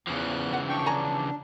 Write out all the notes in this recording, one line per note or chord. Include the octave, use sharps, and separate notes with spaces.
E2 C#3 E3 F3 F#6
F#5
D4 G5 C#6
D4 G#5 A#5 C#6